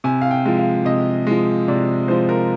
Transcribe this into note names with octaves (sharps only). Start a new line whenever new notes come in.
C3 G#5
F5
G5
F3 G#3
F5
C3 D#5
F3 G#3
C3 D5
F3 G#3 C5
A#4